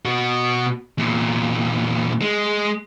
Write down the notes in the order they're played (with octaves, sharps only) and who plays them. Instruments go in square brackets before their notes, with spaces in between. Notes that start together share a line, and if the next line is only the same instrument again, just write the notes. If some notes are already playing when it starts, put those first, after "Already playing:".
[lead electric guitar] B2 F#4
E2 A#2
G#3